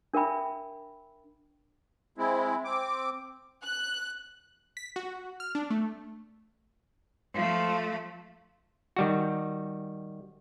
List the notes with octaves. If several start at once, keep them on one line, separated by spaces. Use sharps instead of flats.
D4 A#4 E5 G5 B5
G#3 C4 E4
C4 D6
F#6
B6
F#4
F6
D4
A3
F3 A3
D#3 G3 F#4